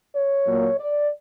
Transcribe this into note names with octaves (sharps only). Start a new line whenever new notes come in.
C#5
A#2 F#3 A#3
D5